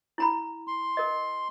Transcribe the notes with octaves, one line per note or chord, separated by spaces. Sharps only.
E4 A#5 B5
C6
A#4 D#5